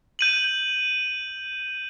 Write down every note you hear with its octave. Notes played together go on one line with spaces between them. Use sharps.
G6 D#7 F#7